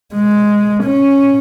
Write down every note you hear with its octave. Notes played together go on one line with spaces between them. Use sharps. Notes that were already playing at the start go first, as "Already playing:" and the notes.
G#3
C#4